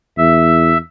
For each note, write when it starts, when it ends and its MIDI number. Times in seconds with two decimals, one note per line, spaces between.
0.17 0.77 40
0.17 0.78 76